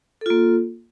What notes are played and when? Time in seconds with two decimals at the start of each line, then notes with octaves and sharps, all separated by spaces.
0.21 A4
0.26 F4
0.30 A#3